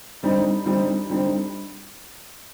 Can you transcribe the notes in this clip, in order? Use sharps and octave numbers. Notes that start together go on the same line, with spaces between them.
D3 G3 C4 D#4
D3 G3 C4 D#4
D3 G3 C4 D#4